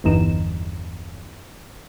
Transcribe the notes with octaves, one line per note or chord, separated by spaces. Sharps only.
G1 E2 G2 E3 D#4 E7